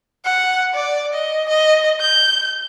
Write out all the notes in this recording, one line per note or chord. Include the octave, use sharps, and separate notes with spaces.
F#5
D5
D#5
D#5
G6